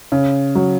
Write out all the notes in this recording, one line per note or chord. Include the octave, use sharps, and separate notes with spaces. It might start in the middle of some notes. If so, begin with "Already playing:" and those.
C#3
F#3